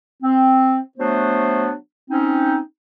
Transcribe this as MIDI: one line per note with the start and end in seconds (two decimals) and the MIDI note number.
0.23 0.78 60
0.98 1.71 54
0.98 1.71 57
0.98 1.71 59
0.98 1.71 62
0.98 1.71 72
2.10 2.58 60
2.10 2.58 61
2.10 2.58 63